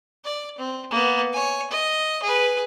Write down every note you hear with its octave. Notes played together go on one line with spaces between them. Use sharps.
D5
C4
A#3 B3
C#5 G#5
D#5
G#4 B4